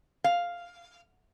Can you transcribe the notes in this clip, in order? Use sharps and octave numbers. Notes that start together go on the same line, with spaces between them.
F5